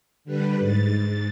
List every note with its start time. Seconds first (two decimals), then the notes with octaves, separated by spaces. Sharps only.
0.25 D3 G3 B4
0.59 G#2 A6